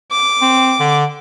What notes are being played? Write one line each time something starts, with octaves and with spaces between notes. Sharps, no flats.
D6
C4
D3